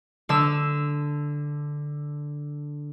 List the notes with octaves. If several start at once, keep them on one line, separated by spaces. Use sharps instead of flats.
D3 E6